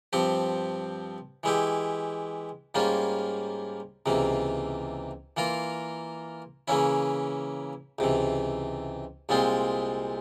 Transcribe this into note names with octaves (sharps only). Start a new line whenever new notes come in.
G2 F3 C4 G4
E3 G#3 E4 G4
G#2 G3 A#3 C#4 F4
C#2 C3 E3 A#3
E3 A#3 F4 A#4
C#3 E3 A#3 C#4 E4
C#2 C3 E3
C2 A#2 G#3 C4 F4